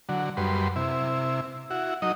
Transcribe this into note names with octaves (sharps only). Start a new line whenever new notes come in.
D3 F#3
F#2 G3 B4 C6
C3 E4
E4 F#4
F#3 D#4 D#5